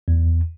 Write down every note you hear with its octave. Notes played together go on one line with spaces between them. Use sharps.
E2